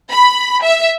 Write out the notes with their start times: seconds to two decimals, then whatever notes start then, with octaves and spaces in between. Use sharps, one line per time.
0.11 B5
0.63 E5